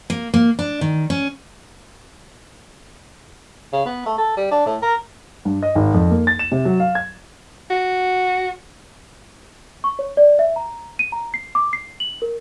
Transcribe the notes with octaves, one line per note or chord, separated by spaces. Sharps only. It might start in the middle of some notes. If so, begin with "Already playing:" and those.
A#3
A#3
D4
D#3
C#4
C#3
B3
A3
A4
G3
D4
A2
A#4
G2
D#5
G#1
F2
A#3
A6
E7
C3
F#3
F5
G#6
F#4
C#6
C#5
D5
E5
A#5
D#7
A#5
C7
D6
C7
F#7
A#4